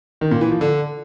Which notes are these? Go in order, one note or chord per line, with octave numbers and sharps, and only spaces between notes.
D#3
A#2
E3
F3
D3